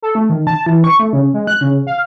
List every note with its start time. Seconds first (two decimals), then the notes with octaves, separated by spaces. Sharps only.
0.02 A4
0.15 A3
0.30 D#3
0.47 A5
0.66 E3
0.84 C#6
1.00 A3
1.13 C#3
1.34 G#3
1.47 F#6
1.61 C#3
1.87 F5